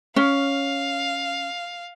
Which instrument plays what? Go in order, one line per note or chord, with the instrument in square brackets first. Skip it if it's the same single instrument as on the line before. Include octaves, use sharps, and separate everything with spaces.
[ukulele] C#4 [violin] F5